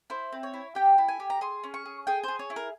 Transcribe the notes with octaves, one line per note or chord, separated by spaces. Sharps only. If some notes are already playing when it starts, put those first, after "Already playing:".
E4 C5
C4
C#5
E4
G4 G5
E4
G#5
G4
A#5
G#4 C6
C#4
C#6
G#4
G#4 G5
G#4 C5
C#5
E4
A#4